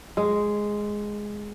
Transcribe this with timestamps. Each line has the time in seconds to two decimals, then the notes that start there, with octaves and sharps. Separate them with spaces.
0.17 G#3